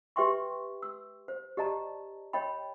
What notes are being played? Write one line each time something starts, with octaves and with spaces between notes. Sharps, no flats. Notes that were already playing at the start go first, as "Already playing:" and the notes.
G4 B4 E5 G5 C6 C#6
E6
C5
G4 D5 D#5 A5 A#5
C#5 D#5 G5 B5